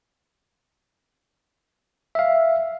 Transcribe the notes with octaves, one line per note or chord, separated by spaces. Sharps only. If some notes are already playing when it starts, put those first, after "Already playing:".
E5 F5